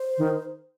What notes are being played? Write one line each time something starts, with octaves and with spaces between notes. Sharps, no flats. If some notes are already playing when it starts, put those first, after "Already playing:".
Already playing: C5
D#3